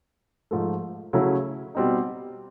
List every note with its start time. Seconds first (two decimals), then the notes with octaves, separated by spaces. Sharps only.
0.51 G#2 F3 A3
1.13 C#3 F#3 A3 C#4 E4
1.75 B2 G3 C4 D#4